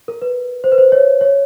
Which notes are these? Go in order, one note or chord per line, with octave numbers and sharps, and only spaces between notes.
A#4
B4
C5
B4
C5
C#5
C#5